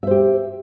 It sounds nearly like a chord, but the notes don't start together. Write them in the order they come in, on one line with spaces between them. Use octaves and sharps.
E5 C5 G4